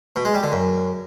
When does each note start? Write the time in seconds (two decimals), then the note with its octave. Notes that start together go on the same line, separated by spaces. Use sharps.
0.16 B2
0.25 G#3
0.34 G3
0.43 D3
0.52 F#2